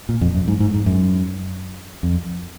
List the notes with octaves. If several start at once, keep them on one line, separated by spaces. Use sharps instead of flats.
A#2
F2
F#2
G#2
G#2
G#2
F#2
F2